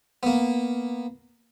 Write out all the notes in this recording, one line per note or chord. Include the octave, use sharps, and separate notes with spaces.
A#3 B3